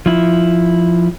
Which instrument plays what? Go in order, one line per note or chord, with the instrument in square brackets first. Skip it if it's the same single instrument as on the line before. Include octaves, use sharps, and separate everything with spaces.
[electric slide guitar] F3 E4